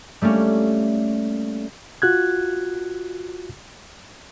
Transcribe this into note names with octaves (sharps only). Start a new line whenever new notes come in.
G3 A3 A#3 C#4
F4 F#4 F#6 G#6